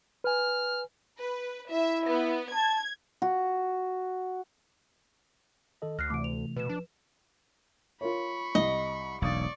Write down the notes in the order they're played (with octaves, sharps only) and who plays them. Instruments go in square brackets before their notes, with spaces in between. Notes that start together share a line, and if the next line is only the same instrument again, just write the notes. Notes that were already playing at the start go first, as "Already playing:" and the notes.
[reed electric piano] B4 G#5 [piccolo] F6
[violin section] B4
[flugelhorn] E4 [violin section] E5
[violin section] B3
[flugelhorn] A5 [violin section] G#6
[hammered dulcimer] F#4
[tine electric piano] D#3 A4 D#5
[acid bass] D2 [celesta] F6 F#6 C7 [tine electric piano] A#6
[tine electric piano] C3 E3 A3 [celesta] D6 D7
[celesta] F7
[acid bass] B2 [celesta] B4 E7
[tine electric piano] F3 [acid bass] D4
[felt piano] F4 A#4 C#5 [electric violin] B5 C#6
[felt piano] C2 [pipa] D#5
[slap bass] E1 B1 [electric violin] D5 C#6 [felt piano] F5 D#6 A6